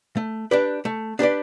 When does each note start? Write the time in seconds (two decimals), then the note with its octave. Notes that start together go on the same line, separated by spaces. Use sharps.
0.17 A3
0.51 D4 G4 B4 D5
0.85 A3
1.19 D4 G4 B4 D5